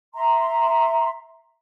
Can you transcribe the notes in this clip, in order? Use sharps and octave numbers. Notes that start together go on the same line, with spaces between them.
E5 A#5 C6